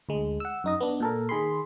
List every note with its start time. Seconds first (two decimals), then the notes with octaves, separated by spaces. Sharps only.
0.09 D2 G#3
0.40 F#5 E6
0.64 F#2 D#4 D#5
0.81 B3 D4
1.00 A#2 A4 A#4
1.29 D#3 G#4 B5 C6